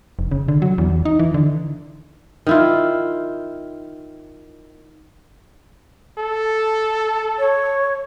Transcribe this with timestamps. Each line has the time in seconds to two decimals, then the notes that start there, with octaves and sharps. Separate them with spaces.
0.19 F1
0.31 C#3
0.48 D3
0.62 F#3
0.78 E2
0.90 E2
1.05 D#4
1.19 E3
1.34 D3
2.47 D#3 E4 F4
6.18 A4
7.39 C#5